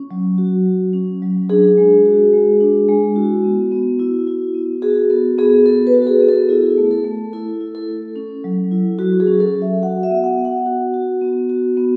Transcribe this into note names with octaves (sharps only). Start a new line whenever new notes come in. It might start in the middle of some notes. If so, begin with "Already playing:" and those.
Already playing: C#4
F#3
F#4
F#3
C#4
F#3
D4 G#4
G#3
F#4
G#3
D4
G#3
E4 F#4
B3
B3
E4
E4
B3
F#4 G#4
B3 A4
B3 G#4
F#4 A4
B4
F#4
A4
G#4
B3
A4
E4 G#4
A3
A4
A3
E4 A4
E4
A4
A3
C#4
F#3
E4
F#3 F#4
G#4
C#4
A4
F#3
E5
F#4 F#5
E5
B3
F#5
B3
F#5
F#4
F#4
B3
F#4
B3